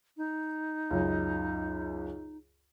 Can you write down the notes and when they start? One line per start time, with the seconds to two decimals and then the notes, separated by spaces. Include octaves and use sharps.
0.17 D#4
0.91 C#2 F#2